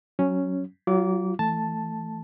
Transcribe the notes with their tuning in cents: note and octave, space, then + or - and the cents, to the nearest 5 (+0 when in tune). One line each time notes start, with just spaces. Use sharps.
F#3 +0 C#4 +0
F#3 +25 F4 -10 D6 -25
E3 +0 A3 +0 A5 +0